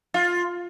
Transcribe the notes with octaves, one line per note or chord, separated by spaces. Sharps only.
F4